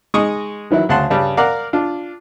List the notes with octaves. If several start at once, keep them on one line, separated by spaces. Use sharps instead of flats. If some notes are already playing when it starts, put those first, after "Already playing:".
G#3 D#4 C#6 D#6
D#3 E3 F#3 E4
D2 C#3 F#5 A5 C6 F#6
G2 C#3 G3
A#4 D5 F5 F#5 A#5
D4 F4